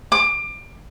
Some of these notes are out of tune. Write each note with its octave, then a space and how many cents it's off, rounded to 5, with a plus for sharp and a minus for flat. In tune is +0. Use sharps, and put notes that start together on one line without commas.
D6 +25